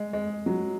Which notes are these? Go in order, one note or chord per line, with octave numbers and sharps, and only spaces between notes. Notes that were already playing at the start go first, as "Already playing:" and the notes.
Already playing: G#3
G#3
F#3